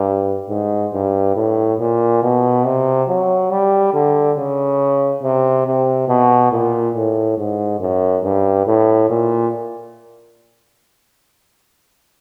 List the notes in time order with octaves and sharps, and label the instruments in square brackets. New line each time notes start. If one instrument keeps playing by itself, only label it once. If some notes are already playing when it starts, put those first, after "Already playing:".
Already playing: [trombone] G2
G#2
G2
A2
A#2
B2
C3
F#3
G3
D3
C#3
C3
C3
B2
A#2
A2
G#2
F#2
G2
A2
A#2